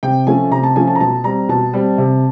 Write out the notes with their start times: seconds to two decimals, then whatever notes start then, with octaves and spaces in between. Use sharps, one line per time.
0.03 C3 G5
0.27 F3 A3 C#4 G#5
0.51 C3 A#5
0.63 A5
0.76 F3 A3 C#4 G#5
0.88 A5
0.95 A#5
1.00 B2 A5
1.24 G3 C4 A#5
1.49 B2 A5
1.73 G3 C4
1.98 C3